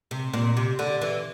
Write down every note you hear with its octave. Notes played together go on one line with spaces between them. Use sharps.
C3
A#2
C3
D3
E3